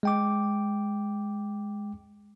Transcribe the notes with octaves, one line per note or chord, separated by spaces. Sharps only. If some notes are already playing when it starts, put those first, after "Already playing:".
G#3 G5 D6